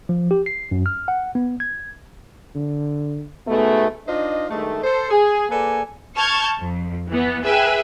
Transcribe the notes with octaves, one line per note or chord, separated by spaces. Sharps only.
F3
G4
C7
F#2
F6
F#5
B3
G#6
D3
G#2 B2 A3 B3
D4 D#4 F4 C5 D#5
G2 D#3 G#3 A3
A4 C5
G#4
A#3 G#4 A4 B4 D5 G#5
A5 C#6 F6 G6 G#6
F2
E3 B3
G#4 B4 E5 G5 G#5